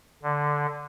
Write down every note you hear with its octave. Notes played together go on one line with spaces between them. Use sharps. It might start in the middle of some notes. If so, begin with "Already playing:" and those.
D3